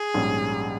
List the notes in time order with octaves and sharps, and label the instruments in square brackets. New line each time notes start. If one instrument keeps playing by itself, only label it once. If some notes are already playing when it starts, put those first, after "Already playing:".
Already playing: [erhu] G#4
[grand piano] A#1 G#2 G3 C#4